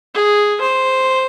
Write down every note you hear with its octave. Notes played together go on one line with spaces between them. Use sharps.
G#4
C5